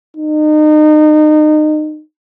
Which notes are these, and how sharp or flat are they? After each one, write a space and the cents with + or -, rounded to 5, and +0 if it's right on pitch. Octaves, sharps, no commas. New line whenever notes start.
D#4 -30